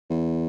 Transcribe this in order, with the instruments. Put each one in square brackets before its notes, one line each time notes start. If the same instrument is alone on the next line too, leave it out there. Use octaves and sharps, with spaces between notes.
[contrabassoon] E2